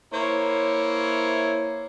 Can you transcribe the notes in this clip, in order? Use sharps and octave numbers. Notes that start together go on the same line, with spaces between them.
A#3 E4 C5 C#5